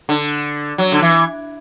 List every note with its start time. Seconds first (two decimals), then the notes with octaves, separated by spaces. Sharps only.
0.09 D3
0.78 F#3
0.92 D3
1.02 E3